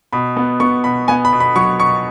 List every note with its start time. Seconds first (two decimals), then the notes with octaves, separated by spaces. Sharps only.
0.13 B2 B5
0.37 B3
0.60 B3 C#6
0.84 B2 B5
1.08 B3 G#5
1.25 B5
1.33 B2
1.40 B5
1.56 F#3 C#6
1.80 B2 C#6